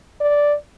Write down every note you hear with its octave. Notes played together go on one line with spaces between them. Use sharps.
D5